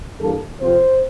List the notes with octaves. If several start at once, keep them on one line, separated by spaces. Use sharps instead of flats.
G2 E3 A#3 A4
F2 C3 F3 C4 C5